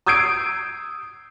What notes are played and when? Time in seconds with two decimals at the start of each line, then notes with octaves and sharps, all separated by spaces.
0.06 D#6 E6 G6 G#6 C7 D7